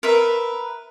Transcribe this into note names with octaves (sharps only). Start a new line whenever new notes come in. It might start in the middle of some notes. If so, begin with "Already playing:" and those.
A#4 B4 E5